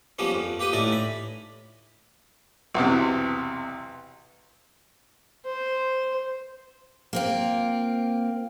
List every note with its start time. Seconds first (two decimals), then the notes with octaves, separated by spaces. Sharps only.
0.19 F3 G3 A#3 B3 C#4
0.34 F2
0.60 A#3 G4 B4 D#6
0.73 A1 A2 D#4 E4 D5
0.93 B5
2.75 B1 E2 C3
5.45 C5
7.13 A#3 C4 F4